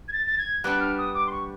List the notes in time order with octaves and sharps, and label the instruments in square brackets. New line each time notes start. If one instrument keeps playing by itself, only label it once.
[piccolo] G#6
A6
A6
G#6
[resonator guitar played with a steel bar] G3 B3 D4 [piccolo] F#6
[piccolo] F6
D#6
D6
C6
C#6